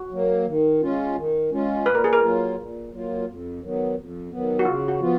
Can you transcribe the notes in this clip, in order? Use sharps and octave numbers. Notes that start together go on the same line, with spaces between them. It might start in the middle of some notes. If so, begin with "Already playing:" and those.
Already playing: F#4
F#3 A#3
D#3
G#3 C#4 F4
D#3
G#3 C#4 F4
A#2 B4
A#4
G#4
A#4
F#3 A#3 F4
A#2
F#3 A#3 F4
F2
D#3 F#3 B3
F2
D#3 F#3 B3
F#4
C#3 F4
F#4
F3 B3 F4